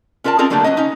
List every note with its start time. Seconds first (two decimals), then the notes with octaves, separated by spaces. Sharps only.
0.24 C#4 F4 A#4 D5 A5
0.38 C4 C#4 F4 G#4 A#4 D5
0.50 D3 F#3 G3 A3 A#3 D4
0.64 F#3 G#3 B3 C#4 D#5
0.77 C#4 D#4